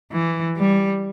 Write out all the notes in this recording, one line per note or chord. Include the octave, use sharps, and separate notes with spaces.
E3
G3